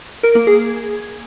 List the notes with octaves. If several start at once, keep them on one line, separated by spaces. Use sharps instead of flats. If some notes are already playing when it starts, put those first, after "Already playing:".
A#4
A#3
G#4